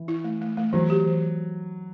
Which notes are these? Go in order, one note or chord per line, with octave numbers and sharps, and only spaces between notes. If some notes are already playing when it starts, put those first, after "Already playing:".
Already playing: E3
E4
A3
A3
A3
E3 F#3
G4
E3